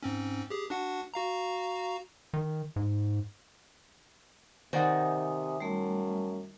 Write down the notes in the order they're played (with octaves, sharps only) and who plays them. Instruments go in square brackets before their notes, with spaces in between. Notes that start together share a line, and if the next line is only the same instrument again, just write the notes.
[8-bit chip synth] G#2 C4 C#4
G4 G#4
D4 F#4 F#5
F#4 F5 A#5
[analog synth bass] D#3
G#2
[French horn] C3 [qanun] D#3 [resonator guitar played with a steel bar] C5 D5 F#5 [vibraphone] G#5 D#6
[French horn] F#2 [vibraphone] G3 A3